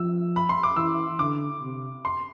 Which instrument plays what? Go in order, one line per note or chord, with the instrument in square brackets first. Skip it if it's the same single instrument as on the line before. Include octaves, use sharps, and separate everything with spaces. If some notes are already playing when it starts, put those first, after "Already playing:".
Already playing: [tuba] F3 [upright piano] E6
[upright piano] B5
C6
D6
[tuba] E3 [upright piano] E6
[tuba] D3 [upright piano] D6
[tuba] C3
[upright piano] C6